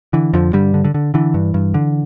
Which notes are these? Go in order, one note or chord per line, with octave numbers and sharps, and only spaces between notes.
D3 E3
F2 D3 F3
G2 D3 G3
D3
D3
D3
D3 E3
G2
G2
D3